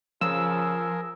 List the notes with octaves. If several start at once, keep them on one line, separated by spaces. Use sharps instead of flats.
C#3 F3 G#4 A#4 E6